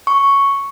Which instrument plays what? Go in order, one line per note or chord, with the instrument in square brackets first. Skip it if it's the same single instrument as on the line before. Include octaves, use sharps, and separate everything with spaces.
[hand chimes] C#6